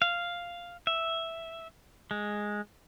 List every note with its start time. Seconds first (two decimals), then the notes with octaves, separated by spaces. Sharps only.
0.02 F5
0.87 E5
2.11 G#3